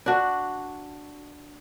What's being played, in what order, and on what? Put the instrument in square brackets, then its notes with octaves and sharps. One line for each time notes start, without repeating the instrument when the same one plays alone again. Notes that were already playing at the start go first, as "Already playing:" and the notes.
[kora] D4 F#4